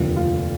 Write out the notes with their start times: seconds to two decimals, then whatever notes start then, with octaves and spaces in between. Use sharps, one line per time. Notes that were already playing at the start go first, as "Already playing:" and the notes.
Already playing: F1 D#2 D3 F3
0.16 F4